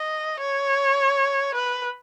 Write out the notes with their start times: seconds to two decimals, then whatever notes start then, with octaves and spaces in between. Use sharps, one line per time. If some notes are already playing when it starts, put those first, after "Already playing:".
Already playing: D#5
0.40 C#5
1.55 B4